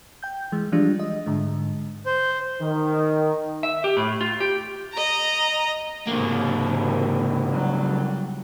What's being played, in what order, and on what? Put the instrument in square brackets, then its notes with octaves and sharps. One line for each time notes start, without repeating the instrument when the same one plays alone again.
[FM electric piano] G5 G6
E3 G#3
E3 F3 G3 G#3 D4 F4
D#5
G#2 D3 G#3
[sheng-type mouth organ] C5
[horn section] D#3
[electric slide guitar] E5
G4
A2
F4
G4
[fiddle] D#5 A#5
[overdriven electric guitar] C#2 A#3 [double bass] G#2 C3
[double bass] F#3 G3